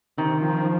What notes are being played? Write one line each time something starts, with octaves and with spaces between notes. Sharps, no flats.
C3 D#3
F3
F3